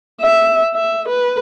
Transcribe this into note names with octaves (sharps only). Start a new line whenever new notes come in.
E5
E5
B4